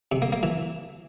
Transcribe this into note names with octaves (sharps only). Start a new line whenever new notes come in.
C3
A#3
A#3
E3